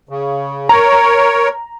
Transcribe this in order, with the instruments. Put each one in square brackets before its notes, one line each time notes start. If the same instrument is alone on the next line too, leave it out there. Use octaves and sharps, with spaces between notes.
[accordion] C#3
[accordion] A#4 C#5 [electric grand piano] A#5